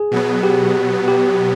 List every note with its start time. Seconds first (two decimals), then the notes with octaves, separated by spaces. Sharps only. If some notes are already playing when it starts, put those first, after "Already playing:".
Already playing: G#4
0.11 B2 F#3 B3
0.43 G4
1.08 G4